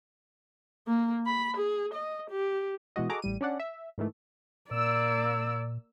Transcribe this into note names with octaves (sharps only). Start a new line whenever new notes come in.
A#3
B5
G#4
D#5
G4
B2 E3 G#3 F#4 D#5
F#4 G#4 A4 D#5 A#5 D6
A1 G3 D#7
C#4 D4 D5 F#5
E5
G#2 D#3 E3 A3
A#2 A#3 D5 E6